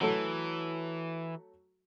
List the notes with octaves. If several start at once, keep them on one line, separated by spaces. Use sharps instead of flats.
E3 F#3 A3